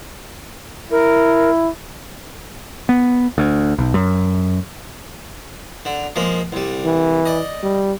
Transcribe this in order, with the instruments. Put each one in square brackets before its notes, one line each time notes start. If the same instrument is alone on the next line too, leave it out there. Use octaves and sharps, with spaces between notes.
[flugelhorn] E4 [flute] A#4
[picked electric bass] B3
D2
B1
F#2
[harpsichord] D3
F3 G#3 A#3
C2 G3
[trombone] E3
[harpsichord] D5 D#5
[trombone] G3